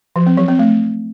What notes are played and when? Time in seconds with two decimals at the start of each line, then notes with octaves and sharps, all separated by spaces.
0.16 F3
0.27 C4
0.37 F#3
0.48 C4
0.59 A3